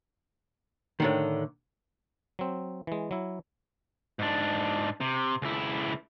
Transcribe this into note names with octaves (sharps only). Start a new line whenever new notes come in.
A2 D3 D#3
F#3 C4
E3 G#3
F#3 E4
G#2 D4
C3
C#2 E4